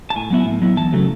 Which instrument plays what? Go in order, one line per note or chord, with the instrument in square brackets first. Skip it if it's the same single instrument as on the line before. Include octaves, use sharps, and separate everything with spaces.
[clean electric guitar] A5
A2 G#5
F#3 B3 E4
A2
F#3 B3 E4
E2 A5
C#3 F#3 A3